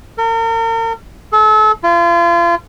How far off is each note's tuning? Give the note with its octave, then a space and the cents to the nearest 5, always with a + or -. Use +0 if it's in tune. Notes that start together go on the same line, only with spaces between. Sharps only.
A#4 -40
A4 -35
F4 -35